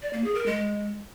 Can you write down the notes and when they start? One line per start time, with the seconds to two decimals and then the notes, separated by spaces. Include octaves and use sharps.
0.02 D5
0.13 A#3
0.24 G#4
0.35 A#4
0.46 G#3